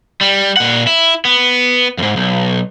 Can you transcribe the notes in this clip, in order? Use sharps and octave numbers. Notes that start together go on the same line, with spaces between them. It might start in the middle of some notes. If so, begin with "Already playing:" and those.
G3
A#2 F#5
E4
B3
F2 G#2
B1